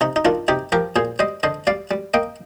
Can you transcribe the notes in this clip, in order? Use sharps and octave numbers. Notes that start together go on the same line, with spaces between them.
C3 D#4
D#4
D#3 D4 F4
C3 D#4 G4
F3 G4 A#4
A#2 G#4 C5
G3 C5 D#5
D3 C5 D#5
G3 D5 F5
G3
A#3 D#5 G5